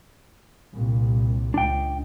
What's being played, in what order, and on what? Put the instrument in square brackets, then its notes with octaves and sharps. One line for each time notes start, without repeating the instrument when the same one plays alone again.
[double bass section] C2 A#2
[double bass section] C#2 [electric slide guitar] D4 G5